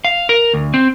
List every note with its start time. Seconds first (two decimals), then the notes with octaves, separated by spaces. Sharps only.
0.05 F5
0.29 A#4
0.54 D2
0.74 C4